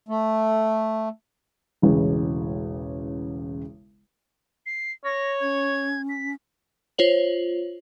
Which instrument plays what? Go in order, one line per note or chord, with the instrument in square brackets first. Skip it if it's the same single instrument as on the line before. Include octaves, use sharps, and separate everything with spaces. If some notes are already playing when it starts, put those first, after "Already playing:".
[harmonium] A3
[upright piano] E1 A1 C#3 G#3
[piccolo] C7
[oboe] C#5 [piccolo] A#6
[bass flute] C#4 [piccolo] G#6
[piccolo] B6
[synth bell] F4 C5 C#5 F#7